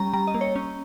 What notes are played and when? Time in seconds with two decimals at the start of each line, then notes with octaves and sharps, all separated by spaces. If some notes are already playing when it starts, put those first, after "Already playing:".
Already playing: G3 C#4 A#5
0.13 G3 A#5
0.27 D#5
0.34 A#3
0.41 C#5
0.56 C#4